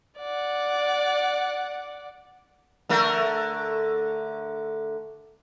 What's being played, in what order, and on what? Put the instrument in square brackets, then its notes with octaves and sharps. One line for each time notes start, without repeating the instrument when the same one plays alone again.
[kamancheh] D5 F#5
[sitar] D3 A3 A#4